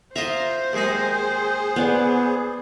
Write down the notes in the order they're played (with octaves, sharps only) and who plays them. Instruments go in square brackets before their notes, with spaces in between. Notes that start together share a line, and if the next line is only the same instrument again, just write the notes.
[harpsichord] F4 D#5 E5 [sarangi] C5 [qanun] A#5 C6
[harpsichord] D#2 G#3 D#4 [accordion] G#4
[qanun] B3 D5 F#5